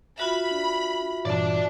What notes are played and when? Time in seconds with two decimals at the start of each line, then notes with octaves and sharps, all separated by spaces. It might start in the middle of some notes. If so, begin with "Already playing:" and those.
0.18 F4 F#4 E5 B5
0.51 D4
1.25 G2 A#2 E3 D5 A5